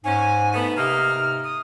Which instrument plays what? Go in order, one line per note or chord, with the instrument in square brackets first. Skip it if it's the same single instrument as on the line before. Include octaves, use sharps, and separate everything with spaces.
[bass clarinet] G#2 [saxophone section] C#4 [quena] G#5
[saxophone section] A3 B3
[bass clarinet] C3 [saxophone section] A#3 D#4 [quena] F6
[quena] D#6